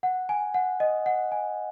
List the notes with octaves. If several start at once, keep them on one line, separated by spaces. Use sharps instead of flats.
F#5
G#5
F#5
D#5
F#5
G#5